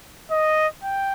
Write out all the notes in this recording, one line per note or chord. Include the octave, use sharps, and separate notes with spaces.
D#5
G5